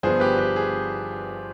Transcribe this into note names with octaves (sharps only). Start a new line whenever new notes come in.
G1 G2 F3 B3 G#4 C5
G4 B4
G4 B4
G#4